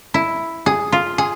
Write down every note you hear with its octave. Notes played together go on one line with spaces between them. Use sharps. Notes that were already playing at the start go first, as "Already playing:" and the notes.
E4
G#4
F4
G#4